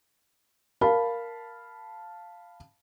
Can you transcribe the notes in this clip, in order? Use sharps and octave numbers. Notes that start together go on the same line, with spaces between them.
A#4 F5 A5 B5